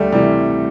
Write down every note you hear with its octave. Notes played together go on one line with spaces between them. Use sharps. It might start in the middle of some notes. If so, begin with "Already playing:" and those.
Already playing: D2 G3 A3
C3 E3 G3